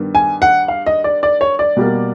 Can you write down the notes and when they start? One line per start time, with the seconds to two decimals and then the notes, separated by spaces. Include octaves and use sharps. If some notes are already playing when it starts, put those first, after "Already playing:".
Already playing: G2 D#3 G3 B3
0.15 G#5
0.42 F#5
0.68 F5
0.86 D#5
1.04 D5
1.23 D5
1.41 C#5
1.59 D5
1.77 B2 G3 A#3